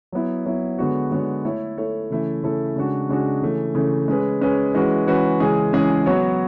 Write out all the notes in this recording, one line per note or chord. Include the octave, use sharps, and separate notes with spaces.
F#3 B3 E4
F#3 B3 E4
D3 G#3 B3 F#4 C#5
D3 G#3 B3 F#4 C#5
A3 E4 A4 C#5
A3 E4 A4 C#5
C#3 E3 A3 E4 A4
C#3 E3 A3 E4 A4
C#3 G#3 D4 F#4
C#3 G#3 D4 F#4
C#3 E3 A3
C#3 E3 A3
G#3 C#4 G#4 B4
G#3 C#4 G#4 B4
E3 G#3 C#4 F#4 B4
E3 G#3 C#4 F#4 B4
C#3 E3 G#3 C#4 G#4
C#3 E3 G#3 C#4 G#4
F#3 B3 F#4 C#5